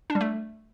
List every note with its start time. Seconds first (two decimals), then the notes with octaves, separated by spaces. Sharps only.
0.10 D4
0.15 G3
0.21 A3